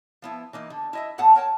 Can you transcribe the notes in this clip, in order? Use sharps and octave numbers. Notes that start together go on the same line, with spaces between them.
F3 B3 E4
E3 A#3 D#4
D3
E4 D#5 E5
A2 B3 A4 F#5 A5
A#4 C#5 G5 A5